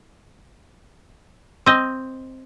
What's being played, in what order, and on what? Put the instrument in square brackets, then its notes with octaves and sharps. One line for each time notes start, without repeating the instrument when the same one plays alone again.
[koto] C4 D#5